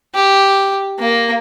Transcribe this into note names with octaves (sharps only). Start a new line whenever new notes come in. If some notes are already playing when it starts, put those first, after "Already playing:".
G4
A#3